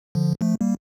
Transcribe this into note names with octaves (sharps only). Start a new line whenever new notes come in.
D3 F3
F3 A3
G3 A#3